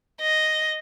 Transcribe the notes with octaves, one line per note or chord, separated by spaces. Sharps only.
D#5